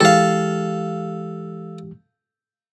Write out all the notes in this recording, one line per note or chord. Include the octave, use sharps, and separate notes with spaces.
E3 G#3 G4 A4 F5